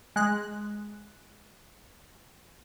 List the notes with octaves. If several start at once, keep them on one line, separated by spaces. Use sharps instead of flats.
G#3 F#6